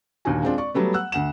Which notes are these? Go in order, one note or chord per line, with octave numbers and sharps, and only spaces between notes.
D#2 A#2 D3 F#4 G#5
G#3 C4 D4 F4
D5 C#6
F#3 G3 A3 B3
F#5 E6 F#6
D2 F#5 E7